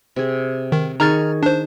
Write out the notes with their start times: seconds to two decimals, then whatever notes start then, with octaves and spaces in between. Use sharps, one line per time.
0.16 C3 G#4
0.72 D#3
1.00 D#3 G#4 A#5 C#6 F6 A6
1.43 D4 C5